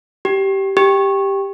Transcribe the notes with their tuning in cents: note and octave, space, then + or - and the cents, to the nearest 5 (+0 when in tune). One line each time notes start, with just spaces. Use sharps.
G4 -15
G4 +5